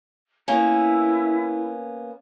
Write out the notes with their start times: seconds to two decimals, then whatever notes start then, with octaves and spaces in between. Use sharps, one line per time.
0.48 A#3 B3 C#4 E4